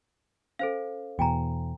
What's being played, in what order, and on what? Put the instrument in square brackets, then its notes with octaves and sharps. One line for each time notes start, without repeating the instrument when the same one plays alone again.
[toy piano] C#4 [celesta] A4 C5 F5
[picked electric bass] E2 B2 [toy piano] G5 G#5 A#5